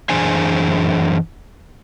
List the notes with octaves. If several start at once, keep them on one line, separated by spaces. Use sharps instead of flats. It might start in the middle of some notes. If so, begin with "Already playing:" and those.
F#2 E3 D4 G#4 C5 G#5